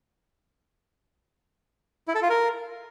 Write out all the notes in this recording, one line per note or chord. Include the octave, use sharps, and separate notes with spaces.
E4
A4
F4
A#4